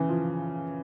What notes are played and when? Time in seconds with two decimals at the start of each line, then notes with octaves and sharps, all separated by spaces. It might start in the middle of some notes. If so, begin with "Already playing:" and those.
Already playing: C#3 E3
0.09 F3